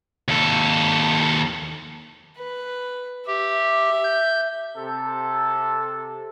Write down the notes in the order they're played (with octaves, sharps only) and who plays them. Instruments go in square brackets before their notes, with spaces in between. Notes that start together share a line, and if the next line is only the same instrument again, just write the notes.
[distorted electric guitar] D#2 A4
[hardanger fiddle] B4
[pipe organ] G4 [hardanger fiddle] E5
[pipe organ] G6
[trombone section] C3 A4